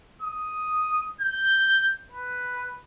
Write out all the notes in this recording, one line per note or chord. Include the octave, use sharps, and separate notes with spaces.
D#6
G6
B4